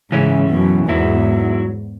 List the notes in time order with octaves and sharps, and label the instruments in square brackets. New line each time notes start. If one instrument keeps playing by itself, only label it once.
[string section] G#2 C#3 [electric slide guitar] E3 C#4 E4
[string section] F#2 B2
[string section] E2 G#2 [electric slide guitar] F#3 E4